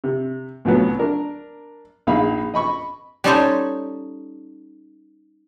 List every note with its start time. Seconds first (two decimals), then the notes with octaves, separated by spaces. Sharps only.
0.04 C3
0.65 C2 A2 F#3 B3
0.99 D4 A#4
2.07 A#1 A#2 D#4 G#4 F5 B5
2.54 D#5 B5 C#6
3.24 G3 C#4 D#4 A4 C5 C#5